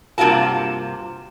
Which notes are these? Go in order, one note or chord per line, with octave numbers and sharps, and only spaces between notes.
G2 C3 A#3 F4 F#4 A5